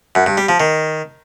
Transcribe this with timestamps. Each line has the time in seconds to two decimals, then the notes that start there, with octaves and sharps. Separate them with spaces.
0.15 F#2
0.26 G2
0.37 G3
0.49 F3
0.60 D#3